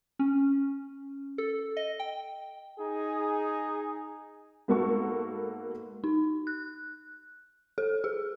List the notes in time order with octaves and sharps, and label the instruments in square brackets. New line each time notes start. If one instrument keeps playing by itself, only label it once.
[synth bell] C#4
A4
D#5
G5
[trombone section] D#4 G#4
[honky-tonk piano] G#2 A#3 B3 F#4 A4 C#6
[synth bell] D#4
F#6
A4
G#4